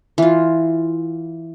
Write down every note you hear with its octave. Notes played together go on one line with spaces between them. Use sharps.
E3 F4